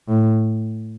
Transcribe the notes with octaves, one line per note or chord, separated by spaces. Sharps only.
A2